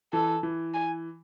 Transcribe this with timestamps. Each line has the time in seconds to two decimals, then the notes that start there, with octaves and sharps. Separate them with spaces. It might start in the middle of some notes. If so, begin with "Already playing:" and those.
0.13 E3 A4
0.43 E3
0.74 G#5